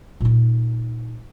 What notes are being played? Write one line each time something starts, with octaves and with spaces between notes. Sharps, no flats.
A#2 D#4